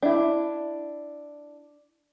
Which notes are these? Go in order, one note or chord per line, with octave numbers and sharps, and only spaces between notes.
D4 E4